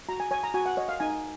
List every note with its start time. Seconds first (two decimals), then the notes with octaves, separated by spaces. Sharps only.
0.09 F#4 A#5
0.20 G#5
0.31 C#5 G#5
0.43 A#5
0.54 F#4 G#5
0.66 F#5
0.77 C#5 D#5
0.89 F5
1.00 D#4 G#5